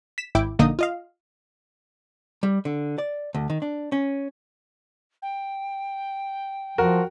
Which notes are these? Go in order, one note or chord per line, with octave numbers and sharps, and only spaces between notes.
B6 E7
G#1 E4 G5 D6 D7
A#1 D3 A#3 D#4 D#5 D#6
F4 D#5 F5
G3
D3
D5
D2
D#3
D4
C#4
G5
F3 F#4 A#4